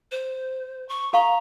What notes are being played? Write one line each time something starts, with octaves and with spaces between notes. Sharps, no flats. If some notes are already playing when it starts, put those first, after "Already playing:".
C5
C#6
A4 F5 A#5 C#6